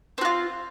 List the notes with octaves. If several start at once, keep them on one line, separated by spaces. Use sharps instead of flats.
C4 F4 F#4